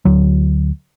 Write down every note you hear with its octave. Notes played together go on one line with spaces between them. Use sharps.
D2 F#3